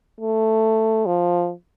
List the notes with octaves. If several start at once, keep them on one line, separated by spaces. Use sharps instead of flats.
A3
F3